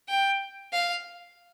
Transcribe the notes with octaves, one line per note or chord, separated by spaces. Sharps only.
G5
F5